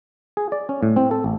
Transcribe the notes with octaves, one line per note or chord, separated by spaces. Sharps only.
G#4
D5
C#4
A2
C4
A4
A1